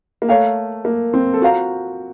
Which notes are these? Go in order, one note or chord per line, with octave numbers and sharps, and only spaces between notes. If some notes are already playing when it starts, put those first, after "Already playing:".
A#3
A3 A#4 C#5 F5 A#5
A#3
C4
A4
F4 F#4 C5 F5 A#5